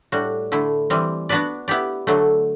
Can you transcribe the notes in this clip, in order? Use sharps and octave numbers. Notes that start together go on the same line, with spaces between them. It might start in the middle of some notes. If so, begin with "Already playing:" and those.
A2 G3 D4 F#4
D3 A3 E4
E3 G3 C4
B3 D4 F#4 B4 D5
B3 E4 G4 D5
D3 F#3 A3